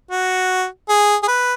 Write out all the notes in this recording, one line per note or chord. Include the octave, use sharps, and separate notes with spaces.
F#4
G#4
G#4
B4